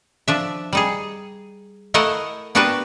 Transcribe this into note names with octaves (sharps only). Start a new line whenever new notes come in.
F3 D4 E5
G3 D#4 G#4
A3 E4 A#4 D#5 F5 F#5
B3 D4 F#4 G4 A#4 B4